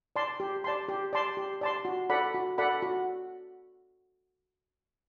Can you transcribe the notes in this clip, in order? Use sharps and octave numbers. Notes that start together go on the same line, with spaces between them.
D5 A5 C6
G4
D5 A5 C6
G4
D5 A5 C6
G4
D5 A5 C6
F#4
A4 D5 F#5 B5
F#4
A4 D5 F#5 B5
F#4